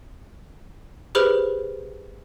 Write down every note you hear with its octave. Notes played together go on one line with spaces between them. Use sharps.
G4 G#4 B4 C5 B5 F6